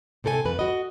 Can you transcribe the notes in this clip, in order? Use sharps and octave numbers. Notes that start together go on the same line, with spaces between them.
C3 C4 A4 B4 G#5
F2 B4
F#4 D#5